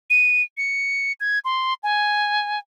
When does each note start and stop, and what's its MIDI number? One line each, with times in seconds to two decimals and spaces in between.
0.10 0.43 99
0.57 1.12 97
1.20 1.39 92
1.45 1.74 84
1.83 2.59 80